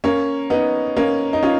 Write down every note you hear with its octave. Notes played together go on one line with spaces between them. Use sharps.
A#3 C#4
B3 D#4
A#3 C#4
D#4
C#4 F4